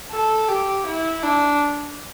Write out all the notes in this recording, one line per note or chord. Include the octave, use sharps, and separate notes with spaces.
A4
G4
E4
D4